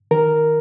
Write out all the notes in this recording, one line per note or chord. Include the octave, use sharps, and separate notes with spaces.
D#3 A#4